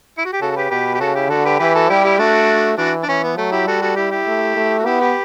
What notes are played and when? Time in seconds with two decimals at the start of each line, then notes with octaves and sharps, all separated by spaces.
0.18 E4
0.25 F#4
0.33 G4
0.41 C#3 F#4 A4
0.51 A4
0.57 G4 B4
0.70 B2 G4 B4
0.95 G4
1.00 C#3 F#4 A4
1.15 E4 G4
1.30 D3 F#4 A4
1.45 G4 B4
1.59 E3 G4 B4
1.75 F#4 A4
1.89 G3 E4 G4
2.04 E4 G4
2.19 A3 D4 F#4
2.78 E3 D4 F#4
3.03 D4
3.08 E3 C#4
3.23 B3
3.37 F#3 A3
3.52 E4 G4
3.67 G3 F#4 A4
3.82 F#4 A4
3.96 E4 G4
4.11 E4 G4
4.27 A3
4.56 A3
4.79 F#4
4.85 B3 E4 G4
5.01 G4 B4